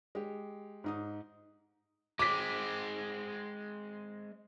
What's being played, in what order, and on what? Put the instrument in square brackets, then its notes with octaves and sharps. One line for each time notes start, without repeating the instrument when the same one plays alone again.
[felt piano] G#3 G4
G#2 D#4 D#6
[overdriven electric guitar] G#3 C4 [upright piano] D6 B6